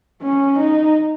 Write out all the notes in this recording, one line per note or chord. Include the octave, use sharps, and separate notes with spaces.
C#4
D#4